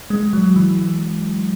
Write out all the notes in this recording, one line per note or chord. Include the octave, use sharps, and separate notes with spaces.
G#3
F#3
E3